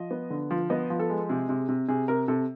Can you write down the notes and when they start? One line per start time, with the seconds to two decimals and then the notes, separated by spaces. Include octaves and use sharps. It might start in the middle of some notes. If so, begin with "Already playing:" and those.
Already playing: F3 D#5
0.11 B3
0.30 D3
0.51 F3
0.70 B3 D#5
0.90 F3
0.99 A4
1.10 G#3
1.29 C3 G#4
1.49 C3
1.69 C3
1.88 C3 G#4
2.08 C3 A#4
2.28 C3 A4